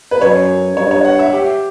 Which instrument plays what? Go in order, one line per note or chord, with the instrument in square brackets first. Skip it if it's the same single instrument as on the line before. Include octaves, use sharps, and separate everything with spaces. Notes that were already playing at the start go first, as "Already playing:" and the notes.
[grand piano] B4
[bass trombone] F#2 [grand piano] C#5
[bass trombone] G2 [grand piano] C#5
[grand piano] C#5
F#5
E5
G4